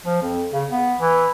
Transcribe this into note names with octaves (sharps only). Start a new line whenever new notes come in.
F3
F2
C#3
B3
E3